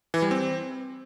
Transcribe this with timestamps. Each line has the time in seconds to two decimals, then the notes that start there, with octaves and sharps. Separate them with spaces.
0.14 E3
0.22 G3
0.31 C4